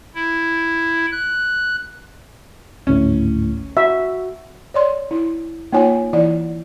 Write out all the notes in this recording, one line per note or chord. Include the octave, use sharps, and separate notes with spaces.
E4
F#6
G#1 D2 A2 C#4
F#4 E5
C#5 D5 C6
E4
A#3 D#4 F4 C#5 G#5
E3 E4 D5 F#5